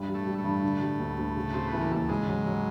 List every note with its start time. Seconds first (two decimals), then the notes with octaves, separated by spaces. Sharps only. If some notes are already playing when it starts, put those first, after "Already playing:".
Already playing: G2
0.08 G3
0.14 A2 A3
0.26 G3
0.38 A2 A3
0.44 G2
0.63 D3
0.81 G3
1.00 D2
1.18 D2
1.36 C#3
1.54 C#3 C4
1.68 B3
1.73 E3
1.81 A#3
1.91 D#2 A3
2.09 G#2 C#3 G#3
2.27 F#3
2.46 F#3